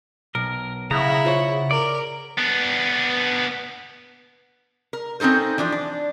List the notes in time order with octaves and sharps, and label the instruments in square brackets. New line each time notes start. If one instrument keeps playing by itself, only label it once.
[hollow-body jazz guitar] B1 [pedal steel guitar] A#4
[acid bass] C#3 [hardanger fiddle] E4 F#5 [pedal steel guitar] A#5
[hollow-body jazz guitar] F4 C5 C#5
[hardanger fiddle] A#4 [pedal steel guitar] D5
[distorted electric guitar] B3 D4
[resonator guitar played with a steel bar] A#4
C4 C#4 D#4 A4 C5
E3 F3 D4
D4